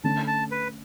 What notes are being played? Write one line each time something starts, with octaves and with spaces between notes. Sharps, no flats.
D3 A3 C#4 A5
A5
B4